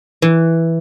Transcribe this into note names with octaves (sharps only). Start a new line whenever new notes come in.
E3